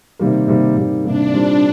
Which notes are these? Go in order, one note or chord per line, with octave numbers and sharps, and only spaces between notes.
C3 D#3 G3 A#3
C3 D#3 G3 A#3
C3 D#3 G3 A#3
C3 D#3 G3 A#3 D4
A#2 G3 C4 D#4